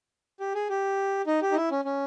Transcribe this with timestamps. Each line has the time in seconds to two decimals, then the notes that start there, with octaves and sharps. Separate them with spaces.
0.40 G4
0.55 G#4
0.70 G4
1.27 D#4
1.42 G4
1.52 D#4
1.56 E4
1.71 C#4
1.85 C#4